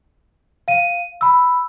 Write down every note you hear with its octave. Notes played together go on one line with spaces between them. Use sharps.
F5 D#7
B5 E6